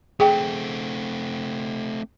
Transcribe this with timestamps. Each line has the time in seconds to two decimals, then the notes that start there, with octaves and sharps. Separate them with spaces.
0.20 A3 C4 G#4 G5